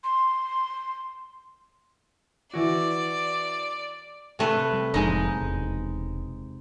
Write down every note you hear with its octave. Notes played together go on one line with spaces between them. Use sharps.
C6
E3 F#4 D5
C3 A3 B4
G3
F1 A2 F3 G#3 D#4
E1